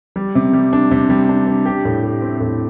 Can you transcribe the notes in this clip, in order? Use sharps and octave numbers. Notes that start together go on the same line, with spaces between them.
G3
C3
G3
D4
C3
G3
D4
D4
G4
A2
G4
C4
A2